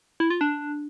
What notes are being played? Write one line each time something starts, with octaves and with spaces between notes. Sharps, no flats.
E4
F4
D4